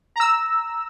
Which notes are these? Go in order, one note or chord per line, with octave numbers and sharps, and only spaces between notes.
A#5 E6